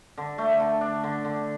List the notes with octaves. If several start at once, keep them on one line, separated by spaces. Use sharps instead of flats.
D3
A3
D3
D4
D3
D3